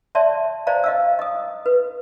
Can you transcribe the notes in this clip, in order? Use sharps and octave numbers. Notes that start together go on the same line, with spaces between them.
C#5 D5 E5 A5 C6
C5 D5 D#5 F5 A#5
D#5 F5 E6
D#5 D#6
B4